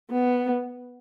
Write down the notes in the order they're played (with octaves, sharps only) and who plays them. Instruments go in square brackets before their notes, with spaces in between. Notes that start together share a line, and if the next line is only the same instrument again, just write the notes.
[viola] B3